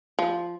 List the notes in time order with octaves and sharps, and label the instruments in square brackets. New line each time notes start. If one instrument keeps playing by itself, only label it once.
[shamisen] F3